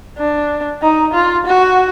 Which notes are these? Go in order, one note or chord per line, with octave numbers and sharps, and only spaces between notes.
D4
D#4
F4
F#4